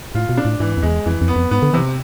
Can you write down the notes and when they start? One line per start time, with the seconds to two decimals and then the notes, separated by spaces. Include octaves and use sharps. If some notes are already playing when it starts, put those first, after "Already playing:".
0.15 A2 F4
0.29 B2
0.37 D4
0.45 A2
0.60 G#2 E3
0.77 F2
0.83 E2 G#3
1.06 F2 E3
1.21 F2
1.28 B3
1.36 F2
1.51 G#2 B3
1.62 D3
1.73 C3 E3